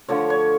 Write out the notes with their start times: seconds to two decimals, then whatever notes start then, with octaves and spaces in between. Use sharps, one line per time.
0.08 D3 F3 A3 C#5
0.30 C#5